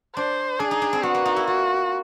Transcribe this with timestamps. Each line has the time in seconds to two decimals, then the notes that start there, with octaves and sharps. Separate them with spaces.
0.16 D4 C5
0.60 D4 G#4
0.71 D#4
0.82 D4
0.93 C4
1.03 B3 F#4
1.15 A#3
1.25 D#4
1.36 E4
1.47 F4 F#4